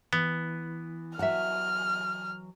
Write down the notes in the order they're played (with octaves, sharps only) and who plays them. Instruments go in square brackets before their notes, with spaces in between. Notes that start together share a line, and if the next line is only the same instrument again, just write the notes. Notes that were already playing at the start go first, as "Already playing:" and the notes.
[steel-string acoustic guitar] E3 [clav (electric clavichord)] B3
[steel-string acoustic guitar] E3 F#3 [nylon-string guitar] E5 F#5 [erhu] F6